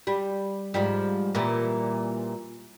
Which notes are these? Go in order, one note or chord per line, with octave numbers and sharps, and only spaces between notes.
G3
G#2 F3 G3
A#2 E3 G3